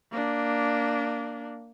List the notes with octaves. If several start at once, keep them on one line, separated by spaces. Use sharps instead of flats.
A#3 D4